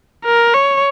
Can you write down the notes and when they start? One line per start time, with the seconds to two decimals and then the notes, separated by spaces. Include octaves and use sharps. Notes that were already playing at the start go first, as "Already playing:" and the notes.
0.25 A#4
0.54 C#5